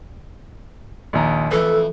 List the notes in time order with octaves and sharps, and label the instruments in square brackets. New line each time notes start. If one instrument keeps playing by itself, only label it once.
[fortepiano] A#1 D#2 A#5
[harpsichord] F2 E3 A3 [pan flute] A4 [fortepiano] B4